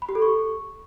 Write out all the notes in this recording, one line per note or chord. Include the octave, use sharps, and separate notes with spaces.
B5
G4
A4
C#6